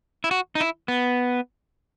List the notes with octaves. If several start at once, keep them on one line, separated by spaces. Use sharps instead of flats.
E4
F#4
D#4
E4
B3